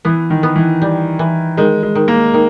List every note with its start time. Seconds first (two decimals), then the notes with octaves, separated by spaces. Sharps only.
0.05 E3 B3
0.30 D#3
0.43 B3
0.56 E3
0.82 G3
1.19 E3
1.57 D#3 G#3
1.83 G#3
1.95 D#3
2.08 A#3
2.34 D#3